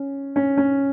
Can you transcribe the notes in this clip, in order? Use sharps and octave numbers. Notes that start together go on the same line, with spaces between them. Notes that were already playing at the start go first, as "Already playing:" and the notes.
Already playing: C#4
C#4
C#4